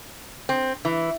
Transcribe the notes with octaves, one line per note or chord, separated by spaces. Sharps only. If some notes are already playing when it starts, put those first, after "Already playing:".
C4
E3